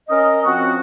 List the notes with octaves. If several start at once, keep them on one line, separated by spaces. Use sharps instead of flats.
C#4 A#4 D#5
F3 C4 C#4 F#4